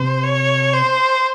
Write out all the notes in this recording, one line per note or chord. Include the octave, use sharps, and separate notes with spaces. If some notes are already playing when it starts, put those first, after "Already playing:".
Already playing: C3 C5
C#5
C5